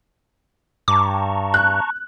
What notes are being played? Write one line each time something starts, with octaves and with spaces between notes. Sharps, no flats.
G2 A5 A#5 C#6 D6
F#6